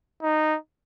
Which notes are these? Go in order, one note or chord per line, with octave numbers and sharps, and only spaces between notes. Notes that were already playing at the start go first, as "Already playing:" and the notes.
D#4